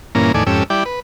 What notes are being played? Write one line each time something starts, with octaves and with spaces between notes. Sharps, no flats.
G2 A#2 E3 A#3 C#4 A#5
E2 A2 D#3 A4 D5 G#5
F2 G#2 C#4 G4 A4 E6
G3 E4 D5 G5
B4